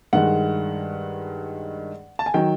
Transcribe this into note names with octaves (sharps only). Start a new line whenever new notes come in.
G2 D#3 G#3 F#5
A5
G#5
D#3 F#3 G5